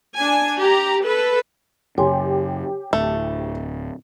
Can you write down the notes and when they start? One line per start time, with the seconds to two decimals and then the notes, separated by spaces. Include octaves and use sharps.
0.17 D4 G#5
0.60 G4 A#5
1.05 A4 B4
1.98 F#2 C#3 G4 C#5 G#5 C6
2.93 D1 A3